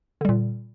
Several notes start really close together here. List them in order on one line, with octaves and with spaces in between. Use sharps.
D3 G3 A#2